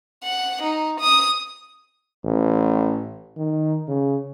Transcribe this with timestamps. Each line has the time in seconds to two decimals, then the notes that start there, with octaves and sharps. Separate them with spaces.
0.24 F#5
0.62 D#4
1.00 D#6
2.25 A1
3.37 D#3
3.88 C#3